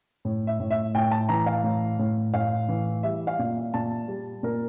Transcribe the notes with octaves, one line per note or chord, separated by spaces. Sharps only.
A2
E5
A2
E5
A2 G5
A5
E3 A#5
F5
A2
A2
A2 F5
E3
G3 E5
F5
A#2
A#2 A5
G3
A#2 A#4